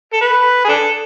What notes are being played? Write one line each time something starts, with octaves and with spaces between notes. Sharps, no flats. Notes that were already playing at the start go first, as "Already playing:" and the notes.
A4
B4
G#4
D4 A4